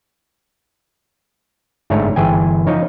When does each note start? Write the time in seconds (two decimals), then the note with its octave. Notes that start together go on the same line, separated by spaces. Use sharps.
1.90 G1 G#2 A3 D4 C#5 A#5
2.16 G1 E3 G#4 G5 G#5
2.67 F3 D#4 C#5